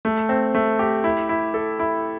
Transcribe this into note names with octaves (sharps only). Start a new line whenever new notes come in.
A3
C4
A3
G4
E4
E4
A4
E4